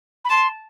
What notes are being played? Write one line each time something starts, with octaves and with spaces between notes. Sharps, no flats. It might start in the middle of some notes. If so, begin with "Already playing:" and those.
B5
A5 C6